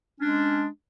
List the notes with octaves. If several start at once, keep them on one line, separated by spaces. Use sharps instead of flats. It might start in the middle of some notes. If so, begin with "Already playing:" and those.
G#3 C#4 D4